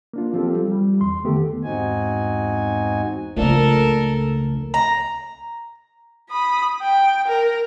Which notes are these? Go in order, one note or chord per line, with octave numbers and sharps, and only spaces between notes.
A#3 D4 F4
F3 C4 F4 G4 A4
G3
G3
E2 C6
D3 D#3 A3 B3 G4 A4
E2 G#2 C4 D#4 F#4 G#5
C#2 C#3 F3 A3 A#3 D4 A4 A#4
A#5
B5 D#6
G5
A#4